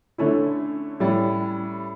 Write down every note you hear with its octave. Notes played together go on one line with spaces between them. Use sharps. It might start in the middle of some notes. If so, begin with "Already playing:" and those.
D3 A3 C#4 E4
A2 G3 C#4